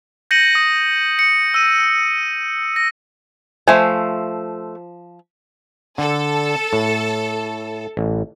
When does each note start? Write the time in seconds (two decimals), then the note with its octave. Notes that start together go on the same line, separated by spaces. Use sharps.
0.31 G6 A#6 C#7 D#7 F#7
0.55 D#6
1.19 C#7
1.54 E6 D#7
2.76 A#6
3.68 F3 A3 C5 E5 G#5
5.98 D3 A4
6.73 A2
7.97 A1